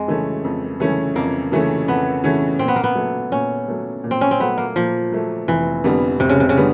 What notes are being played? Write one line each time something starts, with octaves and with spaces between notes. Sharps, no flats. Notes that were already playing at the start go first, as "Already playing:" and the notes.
Already playing: F2 G#3
C#3 E3 A3 C#4
F2
C#3 E3 A3 C#4
F2 A#3
C#3 E3 A3 C#4
F2 B3
C#3 E3 A3 C#4
A#2 C4
B3
A#3
B3
F#3 A3
A#2 C#4
F#3 A3
A#2
C4
C#4
C4
F#3 A3 B3
A#3
A#2 F3
F#3 A3
F1 E3
F2 D3 G3 B3
F1 C3
C#3
C3
C#3
D3 G3 B3